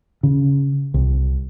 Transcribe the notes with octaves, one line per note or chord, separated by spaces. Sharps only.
C#3
C2